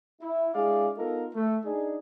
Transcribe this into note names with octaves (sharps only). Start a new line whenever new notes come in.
E4
G#3 D4 E4 G#4 D5 F5
B3 D#4 F4 A4 A#4
A3
D4 D#4 G#4